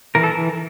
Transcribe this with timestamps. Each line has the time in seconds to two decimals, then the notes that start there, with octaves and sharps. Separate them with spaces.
0.15 E3 A#4
0.23 A4